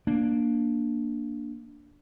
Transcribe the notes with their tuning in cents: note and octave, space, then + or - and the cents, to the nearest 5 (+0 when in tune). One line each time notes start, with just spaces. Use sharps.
A#3 +5 D4 +0